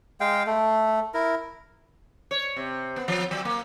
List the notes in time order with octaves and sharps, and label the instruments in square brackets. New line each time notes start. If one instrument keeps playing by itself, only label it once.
[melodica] G#3 F5 G5
A3
E4 A#4
[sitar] C#5
C3
B3
F3
F#3
A#3